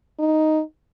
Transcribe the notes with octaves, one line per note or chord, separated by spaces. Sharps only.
D#4